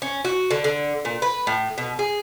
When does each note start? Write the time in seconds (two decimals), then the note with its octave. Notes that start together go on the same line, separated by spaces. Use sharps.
0.02 C#4
0.25 F#4
0.51 D3
0.64 D3
1.05 A#2
1.22 B4
1.47 A2
1.78 B2
1.99 G#4